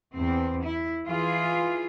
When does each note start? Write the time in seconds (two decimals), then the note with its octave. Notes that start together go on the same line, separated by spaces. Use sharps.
0.14 E2 C4
0.65 E4
1.06 E3 F4 G#4